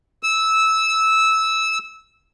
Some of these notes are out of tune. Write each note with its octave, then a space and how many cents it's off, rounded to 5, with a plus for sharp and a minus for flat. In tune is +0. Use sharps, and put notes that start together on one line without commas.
E6 -15